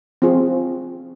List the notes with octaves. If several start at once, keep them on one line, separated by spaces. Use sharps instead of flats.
C4 F4 G#4